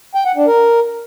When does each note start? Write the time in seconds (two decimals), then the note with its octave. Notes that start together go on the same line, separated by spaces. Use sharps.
0.15 G5
0.25 F#5
0.36 D4
0.47 A#4